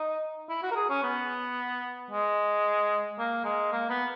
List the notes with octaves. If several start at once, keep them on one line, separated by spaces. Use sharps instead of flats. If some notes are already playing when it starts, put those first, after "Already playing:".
Already playing: D#4
E4
F#4
A#4
G#4
C#4
B3
G#3
A#3
G#3
A#3
B3